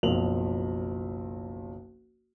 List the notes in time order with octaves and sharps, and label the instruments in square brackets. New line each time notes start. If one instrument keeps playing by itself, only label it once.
[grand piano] F#1 B1 F3 F7 F#7